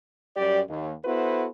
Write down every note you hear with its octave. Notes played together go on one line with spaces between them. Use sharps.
F#2 G3 G4 D5
D#2
B3 E4 F#4 A4 B4 C5